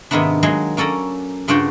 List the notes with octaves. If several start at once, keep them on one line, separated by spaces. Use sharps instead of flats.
G#2 C3 D#3 A#3 B3 D4
F#3 G#3 A#3 G#4
A#3 C#4 A4 D5 A#5
G2 C#3 D4 F4 F#4 G5